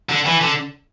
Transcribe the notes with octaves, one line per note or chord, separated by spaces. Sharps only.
D3
E3
D3